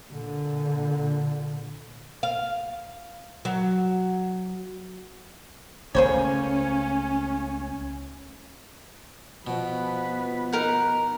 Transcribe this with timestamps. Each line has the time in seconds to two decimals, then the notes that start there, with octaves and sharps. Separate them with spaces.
0.11 A#2 D3
2.23 F5
3.45 F#3
5.95 C#2 A3 A#3 C#4 G#4 C5 C#5
9.47 B2 F3 B3 B4
10.52 D#4 A#4 F#5